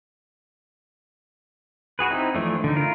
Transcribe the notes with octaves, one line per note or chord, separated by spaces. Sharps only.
F#4 G#4 B4
C4 D#4 E4
E3 F3 A3 D4
D3 D#4
E4 F4 A#4